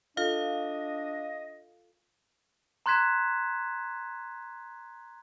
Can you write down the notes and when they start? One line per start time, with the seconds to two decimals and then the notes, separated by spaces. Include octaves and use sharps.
0.17 D4 F4 A4 D#5 F5
2.86 A#5 C6 F#6 G#6 B6 E7